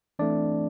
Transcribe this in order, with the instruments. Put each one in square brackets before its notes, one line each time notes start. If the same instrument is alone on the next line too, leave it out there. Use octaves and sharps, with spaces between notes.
[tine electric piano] E3 A3 C4 D4 D5